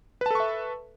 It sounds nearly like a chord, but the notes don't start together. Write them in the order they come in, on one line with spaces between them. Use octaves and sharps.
B4 A5 A4 C#6 E5